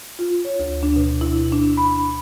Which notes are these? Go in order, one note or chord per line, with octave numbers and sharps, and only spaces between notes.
F4
C#5
D2
D4
B2
E4
D4
B5